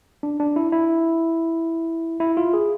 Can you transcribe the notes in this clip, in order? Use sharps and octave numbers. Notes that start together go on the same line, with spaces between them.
D4
D4
E4
E4
E4
F4
G#4